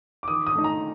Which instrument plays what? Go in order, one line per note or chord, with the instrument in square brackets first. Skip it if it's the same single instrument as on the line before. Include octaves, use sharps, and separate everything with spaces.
[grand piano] D6
[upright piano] D#3 [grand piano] D#6
[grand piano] D#6
[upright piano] A3 D#4
[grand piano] A#5